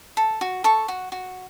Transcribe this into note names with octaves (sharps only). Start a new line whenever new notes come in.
A4
F#4
A4 C#6
F#4
F#4